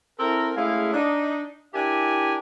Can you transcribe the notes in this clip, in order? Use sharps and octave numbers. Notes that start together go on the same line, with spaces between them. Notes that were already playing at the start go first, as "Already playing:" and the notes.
C4 E4 A4 A#4
G#3 A3 C#4 E4 G#4 F5
D4 D#4
D4 E4 G4 A#4 E5 G#5